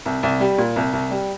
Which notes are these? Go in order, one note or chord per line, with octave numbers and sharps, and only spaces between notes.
C2
C2
G3
A#2
C2
C2
G3